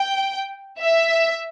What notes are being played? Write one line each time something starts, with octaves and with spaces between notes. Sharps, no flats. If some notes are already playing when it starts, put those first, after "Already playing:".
Already playing: G5
E5